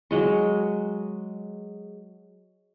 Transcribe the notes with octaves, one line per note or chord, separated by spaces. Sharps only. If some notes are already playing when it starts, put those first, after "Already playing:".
F#3 G#3 C#6